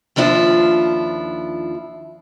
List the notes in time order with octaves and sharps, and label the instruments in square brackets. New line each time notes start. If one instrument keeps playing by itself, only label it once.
[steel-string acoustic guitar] D#2 F3 D4 E4 F4